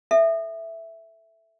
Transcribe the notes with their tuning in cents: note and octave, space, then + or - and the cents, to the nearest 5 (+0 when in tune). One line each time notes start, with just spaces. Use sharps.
A4 +0 E5 +0